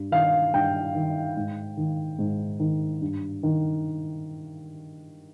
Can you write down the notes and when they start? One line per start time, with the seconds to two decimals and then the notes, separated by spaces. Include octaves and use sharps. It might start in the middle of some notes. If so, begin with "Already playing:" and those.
Already playing: G2
0.11 D#3 F5
0.53 G2 G5
0.95 D#3
1.37 G#2
1.77 D#3
2.19 G#2
2.60 D#3
3.01 G2
3.43 D#3